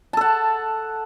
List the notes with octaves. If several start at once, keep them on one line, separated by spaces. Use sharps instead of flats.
A4 F#5 A5